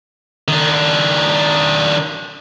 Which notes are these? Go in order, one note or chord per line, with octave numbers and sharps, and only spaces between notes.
D#3 D4